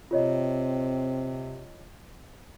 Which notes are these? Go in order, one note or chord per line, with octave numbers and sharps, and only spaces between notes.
C3 C4 F4 C#5 D#5